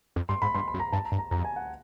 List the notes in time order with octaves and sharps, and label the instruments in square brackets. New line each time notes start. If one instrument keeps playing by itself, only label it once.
[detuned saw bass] F2
[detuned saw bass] G2 [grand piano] C6
[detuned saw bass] G#2 [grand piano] B5
[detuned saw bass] G2 [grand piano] C6
[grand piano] B5
[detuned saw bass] F#2
[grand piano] A#5
[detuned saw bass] G2 [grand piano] A5
[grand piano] A#5
[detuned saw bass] G2
[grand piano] A#5
[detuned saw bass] F2 [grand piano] A#5
[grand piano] G#5
F#5